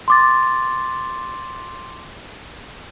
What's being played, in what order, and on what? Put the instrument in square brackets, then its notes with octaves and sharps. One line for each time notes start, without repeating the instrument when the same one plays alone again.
[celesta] C6 D6 A6